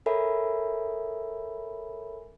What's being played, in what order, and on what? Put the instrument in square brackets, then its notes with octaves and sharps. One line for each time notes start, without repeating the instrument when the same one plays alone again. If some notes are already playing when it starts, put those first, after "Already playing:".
[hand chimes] A4 A#4 C#5 E5 G#5 B5